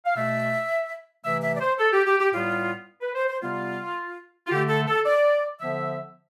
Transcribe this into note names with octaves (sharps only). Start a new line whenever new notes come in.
F5
B2 A3 E5
C3 E3 A3 E5
E5
D5
C5
A4
G4
G4
G4
A2 G3 B3 F4
B4
C5
C5
C3 G3 B3 F4
F4
D3 A3 G4
A4
A4
D5
D3 F3 B3 E5